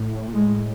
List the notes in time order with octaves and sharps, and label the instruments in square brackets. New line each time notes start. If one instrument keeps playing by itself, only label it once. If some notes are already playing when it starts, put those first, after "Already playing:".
Already playing: [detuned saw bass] A2
A#2
[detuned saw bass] A2 [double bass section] G#3